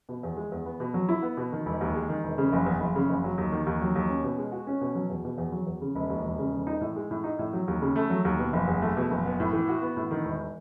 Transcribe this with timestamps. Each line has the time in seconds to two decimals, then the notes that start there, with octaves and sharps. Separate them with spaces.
0.09 B2
0.23 E2
0.37 G#3
0.52 E2
0.66 B3
0.80 B2
0.94 F#3
1.09 E4
1.22 B3
1.37 B2
1.52 D#3
1.66 E1
1.81 D#2
1.95 G#3
2.09 D#3
2.24 E1
2.38 C#3
2.53 F#1
2.66 E2
2.80 F#1
2.95 C#3
3.09 F#1
3.24 F#3
3.38 D#2
3.52 D#3
3.67 D#2
3.81 F#3
3.95 D#2
4.09 C#4
4.24 B2
4.38 G#3
4.52 F#4
4.67 C#4
4.81 B2
4.95 F#3
5.10 E2
5.25 B2
5.38 E2
5.52 F#3
5.67 E2
5.82 C#3
5.95 E1
6.10 D#2
6.24 E1
6.39 C#3
6.53 E1
6.67 D#4
6.81 A2
6.96 G#3
7.11 A2
7.24 D#4
7.39 A2
7.53 F#3
7.68 D#2
7.82 C#3
7.96 A3
8.10 F#3
8.25 D#2
8.39 B2
8.53 F#1
8.68 E2
8.82 A3
8.97 B2
9.11 F#1
9.25 B3
9.40 A2
9.53 E3
9.68 F#4
9.82 B3
9.97 A2
10.11 D#3
10.25 E1